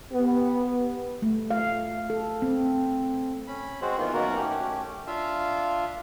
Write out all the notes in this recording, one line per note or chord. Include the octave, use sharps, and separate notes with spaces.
B3 G4
A3
F5
A4
C4
C#4 B5
G#3 C4 F#4 G#4 C5
D#3 E3 A#3 B3 F4
F#2 B2 D#3 A#3 F#4 A#4
A3 C#4 G4
D4 F4 E5 F5